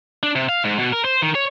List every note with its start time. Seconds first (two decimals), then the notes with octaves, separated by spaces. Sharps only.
0.23 D4
0.35 C3
0.49 F5
0.64 G#2
0.79 B2
0.92 A#4
1.04 C5
1.22 D#3
1.35 C#5